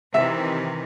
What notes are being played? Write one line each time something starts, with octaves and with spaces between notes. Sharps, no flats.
C3 D#3 E3 E5